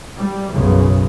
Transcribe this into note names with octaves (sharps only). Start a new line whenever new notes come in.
G3
B1 F#2 C#3